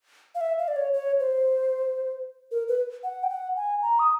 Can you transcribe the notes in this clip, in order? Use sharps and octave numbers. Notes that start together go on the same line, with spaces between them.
F5
E5
F5
D5
C#5
C#5
C5
A#4
B4
F#5
G5
F#5
G#5
A#5
D#6